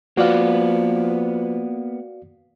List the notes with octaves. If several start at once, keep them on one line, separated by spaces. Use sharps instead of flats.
F3 A#3 B3 F#4 B4 D5 F5